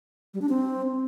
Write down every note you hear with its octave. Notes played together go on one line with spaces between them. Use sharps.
G3
D4
C4